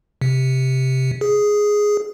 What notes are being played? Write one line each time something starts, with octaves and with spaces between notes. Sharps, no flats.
C3
G#4